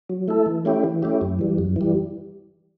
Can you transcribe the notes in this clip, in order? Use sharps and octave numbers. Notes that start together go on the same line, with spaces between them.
F#3
A3 E4 A4
E3
A3 C#4 E4 G4
E3
A3 C#4 E4 G4
F#2
E3 G3
F#2
E3 G3